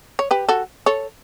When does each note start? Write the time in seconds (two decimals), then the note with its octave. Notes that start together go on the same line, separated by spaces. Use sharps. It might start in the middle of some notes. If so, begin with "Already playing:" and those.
0.19 C#5
0.31 G4 B4
0.49 F#4 A4
0.86 A4 C#5